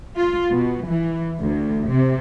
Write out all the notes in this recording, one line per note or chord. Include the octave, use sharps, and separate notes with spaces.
F4
B2
E3
D2
C3